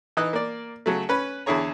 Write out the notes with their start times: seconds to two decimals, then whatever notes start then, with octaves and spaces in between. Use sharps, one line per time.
0.17 E3 D#4 D#5 F#6
0.33 A#3 D5
0.86 C#3 F#3 A3
1.09 C#4 B4 B5
1.46 E2 D3 E4 G#4 C#5 A#5